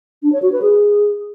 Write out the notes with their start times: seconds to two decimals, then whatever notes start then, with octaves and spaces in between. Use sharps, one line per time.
0.23 D4
0.32 C#5
0.42 F#4
0.52 B4
0.62 G#4